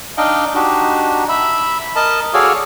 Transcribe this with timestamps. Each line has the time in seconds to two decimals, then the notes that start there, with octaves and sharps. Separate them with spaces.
0.17 D4 D#4 D#5 F5 G5
0.55 D4 D#4 F#4 G4
1.29 E5 B5
1.96 A#4 D#5 A5
2.34 F#4 G#4 A4 C#5 D5 F5